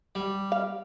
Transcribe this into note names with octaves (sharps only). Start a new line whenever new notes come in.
G3
F5